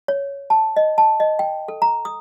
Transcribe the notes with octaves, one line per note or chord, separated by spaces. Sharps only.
C#5
A5
D#5
A5
D#5
G5
A4
A#5
D#6